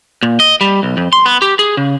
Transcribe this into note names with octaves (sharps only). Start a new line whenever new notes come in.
A#2
D#5
G3
B1
F2
C6
B3
G4
G#4
C#3